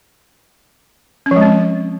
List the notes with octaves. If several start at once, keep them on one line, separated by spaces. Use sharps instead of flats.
C#4
F3
G#3
C4